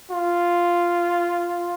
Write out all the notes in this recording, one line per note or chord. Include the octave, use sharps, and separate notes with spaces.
F4